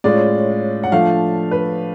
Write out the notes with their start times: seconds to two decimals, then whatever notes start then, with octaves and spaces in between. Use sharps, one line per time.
0.04 A2 G#3 C#4 F4 D5
0.83 F#5
0.92 F3 A3 D4 F5
1.51 B4